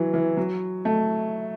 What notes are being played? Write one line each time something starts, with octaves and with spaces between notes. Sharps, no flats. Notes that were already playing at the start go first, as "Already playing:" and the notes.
Already playing: E3 F#3
E3
F#3
A3